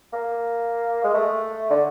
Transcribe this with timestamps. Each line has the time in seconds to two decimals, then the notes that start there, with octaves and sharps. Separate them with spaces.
0.13 A#3
1.04 G#3
1.14 A3
1.71 D3